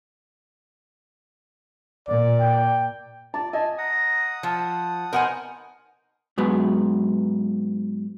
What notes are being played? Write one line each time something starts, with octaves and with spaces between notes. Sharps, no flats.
A#2 D5
G5
D5 A5
D#5 G#5 A5
F#5 A#5 D#6
F3 A5
B3 D#4 A#4 C5 F#5 G#5
G#2 F#3 B3